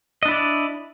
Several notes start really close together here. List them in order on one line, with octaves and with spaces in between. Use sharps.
D#5 D4 E4 D5